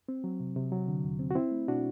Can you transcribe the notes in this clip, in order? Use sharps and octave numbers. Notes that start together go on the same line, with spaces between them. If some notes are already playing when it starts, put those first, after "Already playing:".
C4
F#3
C3
C3
F#3
D3
E2
C4
F#4
C4 E4
A3
B2 D4 F#4